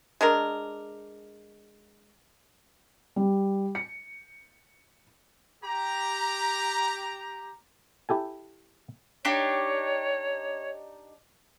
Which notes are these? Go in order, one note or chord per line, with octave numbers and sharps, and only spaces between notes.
G#3 D4 A#4
G3
C#7
G4 A#5
E4 G4 A4 G#5
D4 D#4 G4 C#5